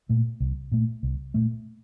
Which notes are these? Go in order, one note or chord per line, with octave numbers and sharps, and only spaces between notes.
A#2 A3
C2
A#2 A3
C2
A#2 A3